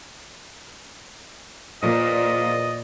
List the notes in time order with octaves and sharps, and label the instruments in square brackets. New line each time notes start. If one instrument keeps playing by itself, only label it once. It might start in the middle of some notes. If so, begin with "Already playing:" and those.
[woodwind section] E2 F3 D5 [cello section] A#2 [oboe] D#5